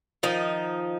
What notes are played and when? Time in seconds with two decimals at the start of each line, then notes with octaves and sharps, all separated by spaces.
0.23 D#3 F3 D#4